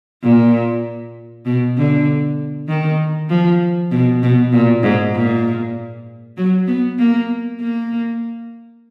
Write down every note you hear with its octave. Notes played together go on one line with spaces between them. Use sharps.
A#2
B2
D3
D#3
F3
B2
B2
A#2
G#2
A#2
F#3
B3
A#3
A#3